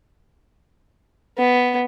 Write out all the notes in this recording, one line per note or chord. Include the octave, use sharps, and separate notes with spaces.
B3